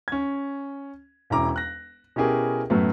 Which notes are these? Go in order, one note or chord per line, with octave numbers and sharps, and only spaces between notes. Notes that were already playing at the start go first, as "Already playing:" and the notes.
C#4 G#6
E1 C#4 E4 A#5 D6
F#6 A#6
B2 C#4 E4 G4 G#4 A#4
F#2 A2 F#3 A3 B3